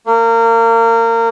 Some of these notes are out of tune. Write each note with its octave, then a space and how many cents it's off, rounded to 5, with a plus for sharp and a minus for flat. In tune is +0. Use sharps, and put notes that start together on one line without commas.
A#3 -25